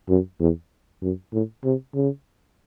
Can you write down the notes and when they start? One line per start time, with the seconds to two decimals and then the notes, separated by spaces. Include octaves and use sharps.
0.09 F#2
0.40 E2
1.02 F#2
1.32 A2
1.64 C3
1.94 C#3